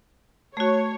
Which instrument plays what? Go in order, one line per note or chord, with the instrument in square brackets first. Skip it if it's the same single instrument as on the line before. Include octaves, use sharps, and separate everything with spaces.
[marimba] A3 F#4 [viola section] C#5